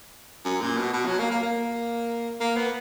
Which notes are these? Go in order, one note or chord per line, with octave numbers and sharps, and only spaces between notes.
F#2
A#2
B2
B2
F#3
A#3
A#3
A#3
A#3
B3